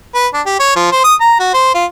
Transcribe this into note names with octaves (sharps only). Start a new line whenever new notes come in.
B4
D4
G4
C#5
F3
C5
D#6
A#5
F#4
C5
F4